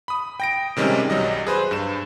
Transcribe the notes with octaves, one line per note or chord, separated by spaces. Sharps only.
B5 D#6
G5 A#6 D7
C3 D#3 G3 G#3 C#4
B1 F#3 G3 D#5
G#4 B4 C5
G2 E7